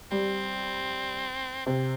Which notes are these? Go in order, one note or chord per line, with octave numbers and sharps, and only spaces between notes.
G3 C4
C3 C4